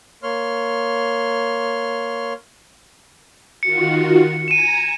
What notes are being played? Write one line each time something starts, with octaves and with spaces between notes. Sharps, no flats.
A#3 C#5 C6 F6
D#3 F4 F#4 C#7
G#5 A#5 G#6 D#7 E7